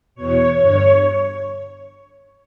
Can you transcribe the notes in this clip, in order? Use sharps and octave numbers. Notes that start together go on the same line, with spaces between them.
E2 B2 C#5
G2 D3 C#5